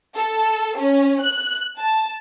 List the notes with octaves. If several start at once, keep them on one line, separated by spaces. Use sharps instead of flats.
A4
C#4
F#6
A5